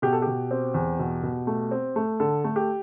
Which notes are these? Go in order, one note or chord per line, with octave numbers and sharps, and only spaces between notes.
B2 G4
A4
B2 G4
C4
E2
B2
B2
A3
C4
A3
D3 A4
A3
G4